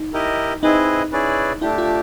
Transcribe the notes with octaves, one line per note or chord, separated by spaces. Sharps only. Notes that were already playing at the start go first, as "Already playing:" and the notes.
Already playing: D#4
E4 G4 A#4 D#5
C4 D#4 E4 G#4 B4 D#5
C#4 E4 G#4 B4 D5
A3 D4 E4 G4
F4